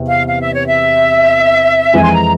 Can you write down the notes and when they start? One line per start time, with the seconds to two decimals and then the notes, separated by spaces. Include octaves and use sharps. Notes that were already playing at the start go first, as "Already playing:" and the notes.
Already playing: E2 C3
0.08 F5
0.27 F5
0.41 E5
0.53 C#5
0.67 E5
1.93 F2 E3 G#3 E4 G#5
2.04 C6
2.12 A#5